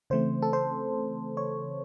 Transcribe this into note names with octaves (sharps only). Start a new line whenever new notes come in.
C#3 E3 A3 C4 C5
A4
C5
C#5